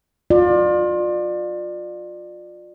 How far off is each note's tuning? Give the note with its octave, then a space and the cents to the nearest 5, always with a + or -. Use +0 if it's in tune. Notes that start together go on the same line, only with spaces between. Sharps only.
F4 +30 D5 +25